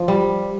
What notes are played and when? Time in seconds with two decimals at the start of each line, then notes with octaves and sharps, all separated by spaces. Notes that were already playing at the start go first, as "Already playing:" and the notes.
Already playing: F3
0.08 G3